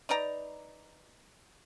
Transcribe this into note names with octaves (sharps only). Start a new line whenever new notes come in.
D#4 B4 D5 A#5